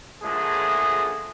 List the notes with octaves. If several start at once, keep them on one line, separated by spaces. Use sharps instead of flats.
A#2 D3 F3 G#3 A3 G#4